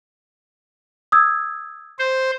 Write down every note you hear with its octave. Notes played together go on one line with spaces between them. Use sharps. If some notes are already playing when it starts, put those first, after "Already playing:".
D#6 E6 G#6
C5